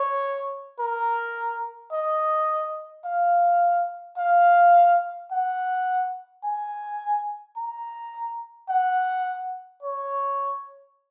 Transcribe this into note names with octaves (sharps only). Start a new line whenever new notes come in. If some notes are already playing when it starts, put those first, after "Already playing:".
Already playing: C#5
A#4
D#5
F5
F5
F#5
G#5
A#5
F#5
C#5